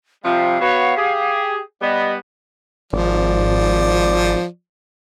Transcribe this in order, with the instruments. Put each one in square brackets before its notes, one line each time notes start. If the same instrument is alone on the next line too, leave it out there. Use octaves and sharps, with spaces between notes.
[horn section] C3 F3 G3 [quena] F5
[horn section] B3 F#4 C#5
G4 G#4
[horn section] G3 B3 [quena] D#5
[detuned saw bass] G#1 [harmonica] F3 D5